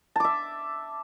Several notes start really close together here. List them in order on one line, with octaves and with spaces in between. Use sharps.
A5 D6 E5